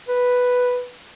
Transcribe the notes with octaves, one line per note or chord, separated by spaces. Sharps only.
B4